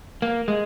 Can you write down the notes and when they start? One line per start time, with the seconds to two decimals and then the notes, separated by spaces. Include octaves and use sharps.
0.22 A#3
0.48 G#3